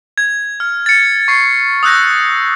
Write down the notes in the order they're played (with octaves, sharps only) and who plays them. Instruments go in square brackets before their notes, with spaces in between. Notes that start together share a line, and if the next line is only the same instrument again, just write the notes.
[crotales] G#6
F6
A6 C#7
C#6 C7
D#6 E6 F#6 G6 A#6